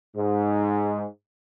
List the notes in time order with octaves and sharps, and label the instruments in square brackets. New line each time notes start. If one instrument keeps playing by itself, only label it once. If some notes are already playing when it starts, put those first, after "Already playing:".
[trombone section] G#2